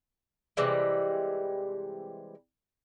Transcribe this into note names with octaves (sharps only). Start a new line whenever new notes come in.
C3 E3 G3 G#3